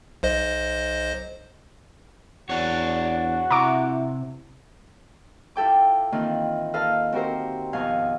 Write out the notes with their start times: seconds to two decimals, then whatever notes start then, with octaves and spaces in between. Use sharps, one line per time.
0.23 B1 C5 D#5
2.50 E2 D4 F#4 C#5
3.51 C3 E4 A#5 C#6 D6
5.56 E4 F4 A4 G5 D6
6.12 D#3 E3 A#3 C4 F4
6.74 A4 B4 D#5 F5 F6
7.12 C4 F#4 G4 A#4 C5
7.73 F2 B2 D#3 F5 G#5